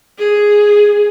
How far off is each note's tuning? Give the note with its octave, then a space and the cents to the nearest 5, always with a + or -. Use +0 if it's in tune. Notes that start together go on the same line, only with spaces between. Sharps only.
G#4 +0